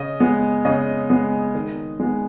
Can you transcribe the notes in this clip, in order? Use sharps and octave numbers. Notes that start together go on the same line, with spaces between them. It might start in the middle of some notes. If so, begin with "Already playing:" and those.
Already playing: C#3 D#5
G#3 B3
C#3 D#5
G#3 B3
D#3
G#3 B3